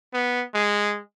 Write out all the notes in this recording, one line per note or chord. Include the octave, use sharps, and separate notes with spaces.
B3
G#3